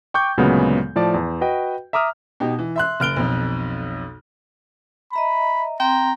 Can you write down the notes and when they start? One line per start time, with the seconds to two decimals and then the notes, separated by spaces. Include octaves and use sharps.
0.14 G5 C#6 D6 G6
0.37 D2 A#2 C#3 F#3 G#3 B3
0.95 A2 F3 D5 A5
1.14 E2
1.41 F#4 B4 D#5 G5
1.93 E5 A#5 D6 D#6 F6
2.40 B2 D#4 G4
2.59 E3
2.76 E5 C6 F#6
3.00 F#1 F6 D7 G7
3.16 B1 F2
5.13 D#5 E5 A#5 B5
5.80 C4 G5 A#5 C6